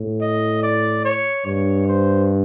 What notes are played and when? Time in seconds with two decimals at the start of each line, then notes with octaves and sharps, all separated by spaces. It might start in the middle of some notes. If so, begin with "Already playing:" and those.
Already playing: A2
0.21 D#5
0.63 D5
1.05 C#5
1.46 G2 C#5
1.88 C5